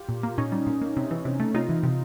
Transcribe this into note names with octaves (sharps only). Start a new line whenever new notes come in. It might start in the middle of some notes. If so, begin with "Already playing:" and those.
Already playing: F4 G4
A#2
A#3
A#2 C#4 D#4
G3
A#2
A#3
C3
E3
C3
A3
C3 D#4 F4
E3
C3